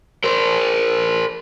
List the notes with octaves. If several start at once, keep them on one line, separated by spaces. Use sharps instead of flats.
A#4 C5